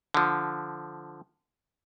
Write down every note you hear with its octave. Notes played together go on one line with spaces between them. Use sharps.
D3 F3